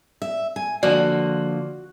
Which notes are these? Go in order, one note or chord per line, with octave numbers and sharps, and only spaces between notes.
E5
G#5
D3 F3 A#3 F#4 D5